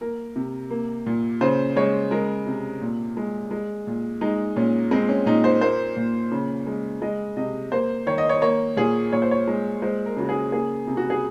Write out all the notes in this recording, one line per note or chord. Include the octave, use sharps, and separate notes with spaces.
A#3 A#4
C3
A#3
A#2
C#3 C5
G#3 C#5
G#3 A#4
C3
A#2
G#3
G#3
A#2
G#3 D#4
A#2 C#4
G#3 C4
C#4
A#2 D#4
C5
A#3 C5
A#2
C#3
G#3
G#3 D#5
C3 D#5
A#3 C5
D#3 C#5
D#5
C#5
A#3 C#5
A#2 G#4
A#2 C#5
C5
C#5
G#3
G#3 C5
A#4
C#3 F#4
G#4
A#3 G#4
C3
F#4
G#4